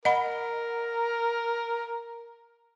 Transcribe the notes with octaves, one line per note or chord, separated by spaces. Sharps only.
A#4 D#5 F#5 B5